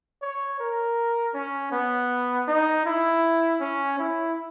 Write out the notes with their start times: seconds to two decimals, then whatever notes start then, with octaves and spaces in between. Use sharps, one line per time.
0.22 C#5
0.60 A#4
1.34 C#4
1.72 B3
2.48 D#4
2.86 E4
3.61 C#4
3.99 E4